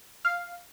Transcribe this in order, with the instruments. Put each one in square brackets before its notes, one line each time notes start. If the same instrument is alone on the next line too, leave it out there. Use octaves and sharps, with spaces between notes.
[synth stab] F5